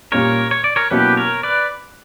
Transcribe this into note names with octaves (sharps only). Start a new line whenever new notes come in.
A#2 G3 A#3 C#4 A#4 C#5
C#5
D5
A#4 C#5
B2 F#3 A#3 C#4 E4 G4 B4
A#4 C#5
B4 D5